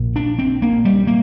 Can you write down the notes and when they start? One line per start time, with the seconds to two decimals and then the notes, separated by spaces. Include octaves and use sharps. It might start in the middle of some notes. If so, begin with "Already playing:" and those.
Already playing: A#1 A#2
0.16 D4
0.39 C4
0.62 A#3
0.85 G3
1.07 A#3